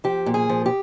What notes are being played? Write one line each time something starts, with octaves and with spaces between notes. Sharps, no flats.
F3 G4
A#2
G#4
F3
G4